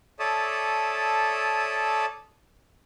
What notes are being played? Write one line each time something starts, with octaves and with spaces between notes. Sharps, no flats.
A4 C#5 D5 E5 A5 D#6